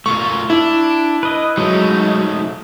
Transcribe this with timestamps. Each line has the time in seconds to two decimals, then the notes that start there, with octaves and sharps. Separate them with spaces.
0.06 A3 F4 A#4 C#6
0.50 D4 E4
1.23 B4 D#5
1.57 F#3 G#3 A3 D#4